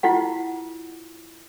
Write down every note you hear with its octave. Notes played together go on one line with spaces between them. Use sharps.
E4 F4 G4 F#5